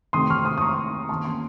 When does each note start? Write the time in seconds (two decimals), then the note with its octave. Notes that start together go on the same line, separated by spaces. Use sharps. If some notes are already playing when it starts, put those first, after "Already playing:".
0.13 C3 D#3 A3 C6 D#6
0.30 C#6 F6
0.45 C6 D#6
0.58 D#6
0.61 A#5 C#6
1.09 D#3 A#3 C#4 A5 C6
1.25 A5 C6